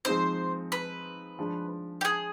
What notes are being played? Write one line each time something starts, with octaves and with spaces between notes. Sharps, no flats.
F3 G#3 C4 D#4 C5
B4
F3 G#3 D4
G4
G#4